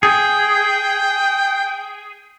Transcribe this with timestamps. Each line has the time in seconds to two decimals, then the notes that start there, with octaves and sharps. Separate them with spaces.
0.03 G#4 G5